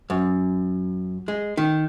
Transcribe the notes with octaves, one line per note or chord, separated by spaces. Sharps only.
F#2
G#3
D#3